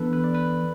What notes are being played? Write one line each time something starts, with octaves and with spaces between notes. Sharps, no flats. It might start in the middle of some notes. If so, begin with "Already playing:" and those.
Already playing: E3 B3 D4 A4 B4
B4
D5
B4